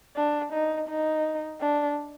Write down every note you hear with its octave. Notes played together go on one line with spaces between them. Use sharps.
D4
D#4
D#4
D4